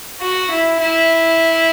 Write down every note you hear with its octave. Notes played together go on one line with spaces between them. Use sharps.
F#4
E4
E4